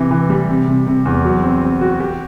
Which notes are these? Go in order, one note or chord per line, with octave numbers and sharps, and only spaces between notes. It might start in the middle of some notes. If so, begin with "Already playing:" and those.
Already playing: C3 E3
E3
G3
C3
C3
C3
E2
F#3
C4
C4
F#4
G4